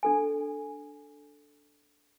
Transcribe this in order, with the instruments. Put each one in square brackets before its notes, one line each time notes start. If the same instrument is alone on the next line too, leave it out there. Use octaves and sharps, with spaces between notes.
[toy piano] D4 A4 G#5